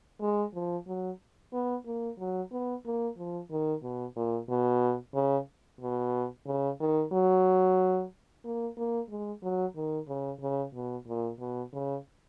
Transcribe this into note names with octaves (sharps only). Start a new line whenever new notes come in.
G#3
F3
F#3
B3
A#3
F#3
B3
A#3
F3
D#3
B2
A#2
B2
C#3
B2
C#3
D#3
F#3
A#3
A#3
G#3
F#3
D#3
C#3
C#3
B2
A#2
B2
C#3